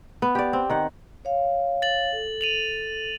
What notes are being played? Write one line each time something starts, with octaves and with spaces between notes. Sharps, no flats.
B3
G4 D5
C4
D#3 F#5
C#5 F5
A6 F#7
A4
D#7 F7 F#7